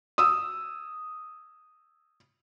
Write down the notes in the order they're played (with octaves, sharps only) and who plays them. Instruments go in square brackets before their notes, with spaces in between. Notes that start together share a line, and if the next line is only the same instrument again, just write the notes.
[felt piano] D#6 E6